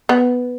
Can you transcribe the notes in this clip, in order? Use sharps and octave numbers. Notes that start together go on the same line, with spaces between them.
B3